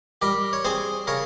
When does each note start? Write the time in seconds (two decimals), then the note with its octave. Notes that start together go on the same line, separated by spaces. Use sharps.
0.22 G3 G4 A#4
0.53 C#5
0.65 C4 G#4 C5
1.07 C#3 A#4 C#5